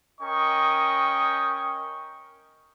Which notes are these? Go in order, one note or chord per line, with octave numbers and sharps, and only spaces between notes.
C#4 A#4 D#5 G5 C#6 D#6